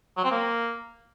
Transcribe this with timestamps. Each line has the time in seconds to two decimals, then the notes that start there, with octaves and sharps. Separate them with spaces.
0.17 F#3
0.24 C4
0.31 A#3